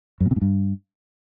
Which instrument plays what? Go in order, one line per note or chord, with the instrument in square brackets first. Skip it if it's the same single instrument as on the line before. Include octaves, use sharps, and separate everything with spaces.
[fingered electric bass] F#2
A#2
C3
G#2
G2